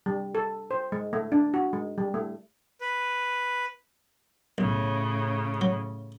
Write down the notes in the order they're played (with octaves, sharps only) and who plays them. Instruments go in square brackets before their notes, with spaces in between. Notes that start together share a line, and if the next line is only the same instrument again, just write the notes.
[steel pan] G3
A4
C5
G#3
A3
D4
F#4
G#3
G3
A3
[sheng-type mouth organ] B4
[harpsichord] B1 [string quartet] A2 C#3
[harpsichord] F#3